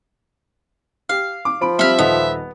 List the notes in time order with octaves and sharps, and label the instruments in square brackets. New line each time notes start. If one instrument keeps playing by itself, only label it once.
[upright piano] G4 [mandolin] F5
[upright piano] D6
[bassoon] F3 [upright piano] B5 D7
[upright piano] G3 C4 [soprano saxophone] E5 [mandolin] B5 F6
[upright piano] D#1 A4 D#5 [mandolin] B3